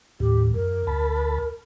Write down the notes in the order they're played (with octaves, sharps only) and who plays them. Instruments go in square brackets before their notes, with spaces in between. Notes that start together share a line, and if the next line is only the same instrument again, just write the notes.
[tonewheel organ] D#2 A2 [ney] G4
[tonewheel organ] F#2 [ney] A#4
[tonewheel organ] D2 A5 B5